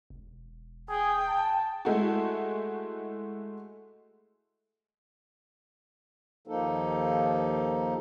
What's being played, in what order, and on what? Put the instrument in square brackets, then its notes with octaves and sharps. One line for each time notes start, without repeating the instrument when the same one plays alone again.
[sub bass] E1
[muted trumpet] G#4 [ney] G5
[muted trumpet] A5
[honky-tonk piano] G#3 A3 E4 F#4
[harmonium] D#2 F3 A#3 D#4 A4